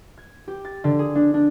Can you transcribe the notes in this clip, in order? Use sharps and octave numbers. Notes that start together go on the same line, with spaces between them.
G#6
G4
A6
D3
G#4
D4
D4